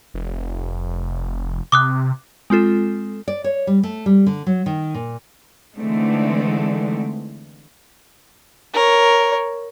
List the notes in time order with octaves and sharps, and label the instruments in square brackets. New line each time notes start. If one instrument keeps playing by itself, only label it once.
[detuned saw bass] F1
[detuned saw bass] C3 [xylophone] D6 D#6 F#6
[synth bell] G#3 C4 F4 A4
[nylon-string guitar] D5
C#5
G3
A3
G3
D3
F#3
D#3
A#2
[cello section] D3 E3 G#3 A3 C4 D#4
[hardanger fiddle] A#4 C#5